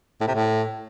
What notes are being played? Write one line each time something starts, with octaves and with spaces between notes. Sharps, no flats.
A2
C3
A2